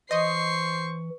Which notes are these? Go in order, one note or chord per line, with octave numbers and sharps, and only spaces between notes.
E3 C5 D#5 C#6 C7